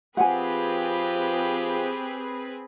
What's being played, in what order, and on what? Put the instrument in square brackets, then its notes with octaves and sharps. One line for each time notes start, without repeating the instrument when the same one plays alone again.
[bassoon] F3 [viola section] C4 G#4 B4 [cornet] G4 [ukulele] F#5 G#5